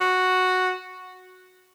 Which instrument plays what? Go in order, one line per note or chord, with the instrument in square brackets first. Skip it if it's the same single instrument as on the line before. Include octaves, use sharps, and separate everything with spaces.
[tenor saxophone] F#4